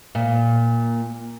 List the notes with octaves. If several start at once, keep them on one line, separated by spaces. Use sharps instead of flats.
A#2